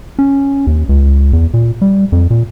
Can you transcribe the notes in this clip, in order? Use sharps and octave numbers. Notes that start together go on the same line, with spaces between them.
C#4
D#2
C#2
E2
A#2
G3
F2
A#2